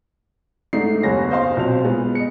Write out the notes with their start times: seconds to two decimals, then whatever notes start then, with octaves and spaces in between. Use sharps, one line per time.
0.73 G#2 A3 D4 D#4 C7
1.03 F#1 D#2 B3 G#4 G#5 A#6
1.31 C5 D#5 F5 C6
1.57 B1 A#2 C4 F7
1.84 G#3 B3
2.15 D#5 C#7